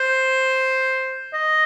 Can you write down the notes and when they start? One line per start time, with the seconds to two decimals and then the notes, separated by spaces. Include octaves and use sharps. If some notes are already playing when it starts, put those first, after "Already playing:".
Already playing: C5
1.34 D#5